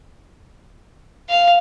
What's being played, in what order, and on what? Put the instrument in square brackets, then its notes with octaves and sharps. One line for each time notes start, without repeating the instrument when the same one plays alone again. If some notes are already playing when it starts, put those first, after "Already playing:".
[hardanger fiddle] F5